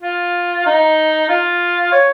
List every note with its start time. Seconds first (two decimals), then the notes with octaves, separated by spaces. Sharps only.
0.03 F4
0.66 D#4
1.29 F4
1.92 C#5